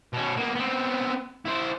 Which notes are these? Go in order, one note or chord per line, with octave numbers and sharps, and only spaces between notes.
B2 C#4
A#3 B3
B3 C4
E4 C5